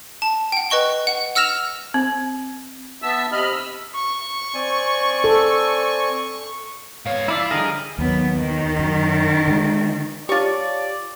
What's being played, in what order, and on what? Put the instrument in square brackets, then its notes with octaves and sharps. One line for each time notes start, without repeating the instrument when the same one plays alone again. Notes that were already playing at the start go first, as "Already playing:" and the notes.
[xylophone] A5
F#5 G5
B4 D#5 C#6 G7
F#5
F#5 E6 F6 A#6 E7 F7
[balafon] C4
[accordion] B3 E5 A5 E6
C3 D#5 B5 F6
E6
[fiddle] C#6
[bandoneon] C4 D5 G#5
[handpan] A4
[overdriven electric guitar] G#2 C#5 [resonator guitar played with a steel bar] B3 C4 F5
[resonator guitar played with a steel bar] F3 [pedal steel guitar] E4 D5 E5 [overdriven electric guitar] F4
[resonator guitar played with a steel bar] D3 F3 G3 [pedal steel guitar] G#4 D#5 [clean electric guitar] A#4
[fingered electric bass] D#2 [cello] F#3 B3
[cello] D#3
[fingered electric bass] F#2
D3 G#3
[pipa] F4 C#6 [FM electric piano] G4 [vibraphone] C#5 F5 A5 [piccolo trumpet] D5